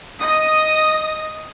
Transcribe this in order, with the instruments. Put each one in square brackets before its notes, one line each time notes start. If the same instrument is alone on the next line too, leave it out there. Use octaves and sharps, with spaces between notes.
[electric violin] D#5 D#6